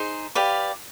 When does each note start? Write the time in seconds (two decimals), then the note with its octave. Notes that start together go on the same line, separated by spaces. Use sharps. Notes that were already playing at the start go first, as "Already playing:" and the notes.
Already playing: D#4 G#4 C5
0.35 G4 B4 D5 F5